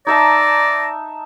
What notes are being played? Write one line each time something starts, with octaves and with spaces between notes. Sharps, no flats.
D#4 D5 E5 A5 A#6